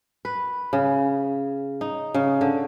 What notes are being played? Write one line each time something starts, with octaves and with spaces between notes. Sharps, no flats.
B4
C#3
D#4
C#3
D3